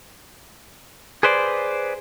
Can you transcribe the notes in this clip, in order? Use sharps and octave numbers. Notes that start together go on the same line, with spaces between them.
G#4 B4 C5 D5